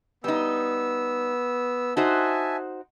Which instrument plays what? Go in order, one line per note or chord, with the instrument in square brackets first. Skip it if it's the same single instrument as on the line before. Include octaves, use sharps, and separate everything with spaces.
[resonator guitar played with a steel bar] G3 D#4 [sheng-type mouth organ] B3 E6
[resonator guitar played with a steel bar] D#4 F#4 C5 [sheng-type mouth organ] E5 G#5 A5